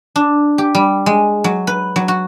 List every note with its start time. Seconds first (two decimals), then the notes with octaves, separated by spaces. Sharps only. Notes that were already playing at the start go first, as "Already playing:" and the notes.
0.16 D4
0.58 G4
0.75 G3
1.06 G#3
1.44 F#3
1.67 B4
1.96 F#3
2.08 F#4